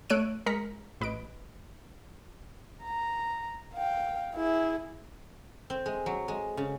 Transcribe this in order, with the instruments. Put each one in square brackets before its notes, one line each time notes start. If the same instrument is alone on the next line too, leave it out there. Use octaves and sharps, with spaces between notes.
[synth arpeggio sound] A3 C#5 E6 F#6 D7 D#7
G#3 A#4 A#5 B6 C#7
A1 B4 D#5 D7
[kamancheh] A#5
F5 G5
E4 G#4
[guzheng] C4
G#3
F#3
G#3
C#3